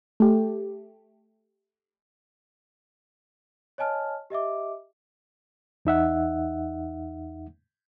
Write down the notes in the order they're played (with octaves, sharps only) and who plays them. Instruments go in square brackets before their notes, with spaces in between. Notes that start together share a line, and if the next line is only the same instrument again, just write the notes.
[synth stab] A3 G4
[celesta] C#5 D#5 G#5 A5 F6
G4 D#5 E5 D6
[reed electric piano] E2 D#4 E5 F#5